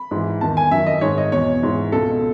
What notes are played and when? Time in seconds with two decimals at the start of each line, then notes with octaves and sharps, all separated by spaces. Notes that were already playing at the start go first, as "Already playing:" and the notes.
Already playing: B5
0.11 G#2 E3
0.41 E2 D#3 A5
0.57 G#5
0.71 F#2 D#3 E5
0.86 D#5
1.01 G#2 D#3 C#5
1.18 D#5
1.32 E2 B2 C#5
1.63 G#2 E3
1.92 C#2 B2 A4